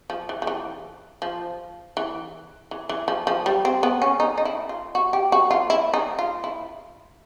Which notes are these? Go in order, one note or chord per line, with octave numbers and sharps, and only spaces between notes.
F3
E3
F3
E3
F3
E3
E3
E3
F3
F3
G3
C4
B3
C#4
D#4
D#4
E4
F4
F#4
G4
F#4
F4
E4
D#4
F4
E4